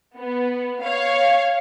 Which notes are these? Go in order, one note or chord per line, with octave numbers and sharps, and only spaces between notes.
B3
C#5 F5